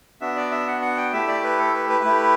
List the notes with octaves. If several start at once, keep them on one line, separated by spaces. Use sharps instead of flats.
B3 D4 F#4 E5
D5
E5
F#5
F#5
G5
A3 E4 G4 E5
D5
B4
A4
B4
B4
A3 E4 G4